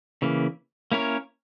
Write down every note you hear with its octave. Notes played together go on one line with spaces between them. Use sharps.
C#3 E3 A#3
A#3 C#4 E4 A#4 C#5